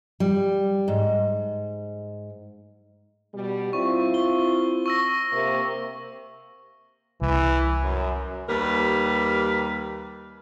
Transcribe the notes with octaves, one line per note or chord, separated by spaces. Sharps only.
G3
G#2
B2 G3
C4 E4 F4 C#6
G7
C#6 E6 A#6
C3 A#3
C2 E3
F#2
D#2 G3 A#4 B4